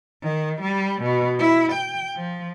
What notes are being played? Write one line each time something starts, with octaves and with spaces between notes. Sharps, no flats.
D#3
G3
B2
E4
G5
F3